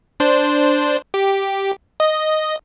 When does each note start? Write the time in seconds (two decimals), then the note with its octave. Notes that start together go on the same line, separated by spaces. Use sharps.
0.20 D4 C5
1.14 G4
2.00 D#5